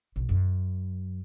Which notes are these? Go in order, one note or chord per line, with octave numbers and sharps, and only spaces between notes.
B1
F#2